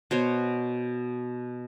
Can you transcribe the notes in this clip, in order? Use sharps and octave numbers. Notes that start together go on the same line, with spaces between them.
B2 C5 C#5